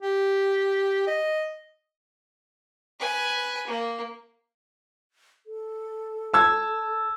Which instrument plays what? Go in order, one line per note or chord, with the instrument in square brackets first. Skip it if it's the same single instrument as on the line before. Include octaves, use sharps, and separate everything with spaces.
[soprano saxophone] G4
D#5
[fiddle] B4 G#5
A#3
[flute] A4
[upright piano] A5 E6 G#6